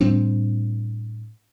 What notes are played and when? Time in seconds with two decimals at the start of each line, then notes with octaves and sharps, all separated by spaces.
0.01 A2 G3 C4 D4